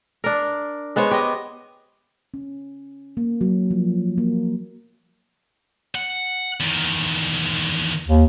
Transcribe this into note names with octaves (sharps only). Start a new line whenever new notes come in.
D4 A#4
G#3 B3 C5 C#5
G4 D#5
C#4
A#3
F#3
F3
A#3
F#5
E2 D#3
D#2